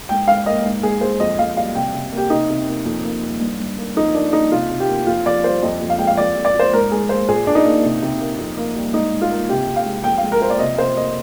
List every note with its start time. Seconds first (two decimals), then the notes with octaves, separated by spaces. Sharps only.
0.09 G#2 G5
0.28 G#2 F5
0.46 A#3 D#5
0.65 G#2
0.83 G#2 G#4
1.01 G#3 C5
1.20 F2 D#5
1.39 F2 F5
1.57 G3 F5
1.75 C3 G5
1.94 C3
2.12 A#3
2.17 G4
2.30 C3 D#4
2.50 C3
2.67 A#3
2.85 F2
3.04 A#3
3.23 G3
3.41 G2
3.60 G2
3.78 A#3
3.96 F2 D#4
4.15 A#3 D4
4.33 G3 D#4
4.52 C3 F4
4.71 C3
4.80 G4
4.88 A#3
5.06 F2 F4
5.26 F2 D5
5.44 G3 C5
5.62 F2 D#5
5.81 F2
5.90 F5
5.99 G#3 G5
6.07 F5
6.17 F2 D5
6.36 F2
6.45 D5
6.54 F3
6.59 C5
6.73 G#2 A#4
6.91 G#2 G#4
7.09 A#3 C5
7.28 A#2 G#4
7.46 A#2 D4
7.55 D#4
7.65 A#3
7.83 C3
8.02 C3
8.20 A#3
8.38 F2
8.58 A#3
8.76 G3
8.94 G#2 D#4
9.12 G#2
9.21 F4
9.31 A#3
9.49 C3 G4
9.67 C3
9.76 F5
9.86 G#3
10.04 F2 G5
10.18 F5
10.23 G#3
10.32 A#4
10.41 F3 C5
10.50 D5
10.59 C3 D#5
10.78 C3 C5
10.96 A#3 D#5